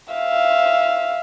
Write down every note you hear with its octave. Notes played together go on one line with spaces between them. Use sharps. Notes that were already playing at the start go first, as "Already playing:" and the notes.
E5 F5